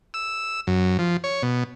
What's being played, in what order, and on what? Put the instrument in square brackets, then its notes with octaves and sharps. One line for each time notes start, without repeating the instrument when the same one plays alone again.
[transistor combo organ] E6
F#2
F3
C#5
B2